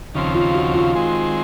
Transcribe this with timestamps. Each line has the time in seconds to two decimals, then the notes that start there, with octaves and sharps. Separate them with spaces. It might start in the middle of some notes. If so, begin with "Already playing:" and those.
0.15 D#2 C#3 F3 C4
0.35 F4
0.55 F#4
0.75 F4
0.95 D#3 G#3 C4